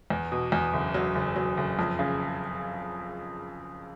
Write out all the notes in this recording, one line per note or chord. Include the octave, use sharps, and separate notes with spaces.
E2
B2
E2
F#1
F#3
F#1
F#3
F#1
F2
C#3